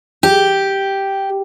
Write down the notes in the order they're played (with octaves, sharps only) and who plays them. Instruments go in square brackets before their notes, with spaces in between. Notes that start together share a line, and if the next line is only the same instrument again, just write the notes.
[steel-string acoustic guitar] G4